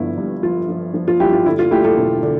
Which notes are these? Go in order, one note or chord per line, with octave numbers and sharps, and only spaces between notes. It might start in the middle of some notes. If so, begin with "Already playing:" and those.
Already playing: G1 G2 F3 E4
G2
F3 F4
F3
F3
F4
G2 E4 G4
F4
D3 E4
F4
D2 E4 G4
F4 A4
E1
D3